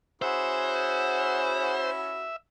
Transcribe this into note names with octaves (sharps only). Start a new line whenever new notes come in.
C#4 E4 F#4 G#4 C5 E5 F#5